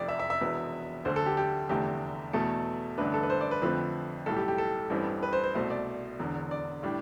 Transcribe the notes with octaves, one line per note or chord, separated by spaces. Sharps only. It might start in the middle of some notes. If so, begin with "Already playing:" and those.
Already playing: F1 F2 C3 D5
E5
E5
E5
E1 E2 B2 B3
D2 D3 A3 C5
A4
G4
G4
F1 E2 D3 A3 G4
E2 B2 A3 A4
A1 G2 D3 A3 D4 B4
A4
B4
C5
D5
B4
F2 D3 F3 A3 C4 B4
B1 A2 G3 A4
G4
G4
A4
A1 G2 E3 G3 C4
B4
C5
C5
C2 B2 A3 C5
D5
E1 E2 D3
D5
A2 G3 D4